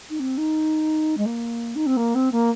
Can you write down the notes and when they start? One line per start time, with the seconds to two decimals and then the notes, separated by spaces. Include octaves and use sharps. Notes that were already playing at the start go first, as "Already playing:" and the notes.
0.09 D#4
0.19 C4
0.37 D#4
1.17 G#3
1.25 A#3
1.75 D#4
1.86 C4
1.96 A#3
2.15 C4
2.31 A#3